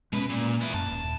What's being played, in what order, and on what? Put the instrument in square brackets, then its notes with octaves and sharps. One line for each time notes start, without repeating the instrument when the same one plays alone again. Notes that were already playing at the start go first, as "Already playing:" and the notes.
[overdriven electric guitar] B2 B4 [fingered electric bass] G#3 C#4
[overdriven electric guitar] A#2
B3 E4
[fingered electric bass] F#2 [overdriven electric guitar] A5
[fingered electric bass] D#1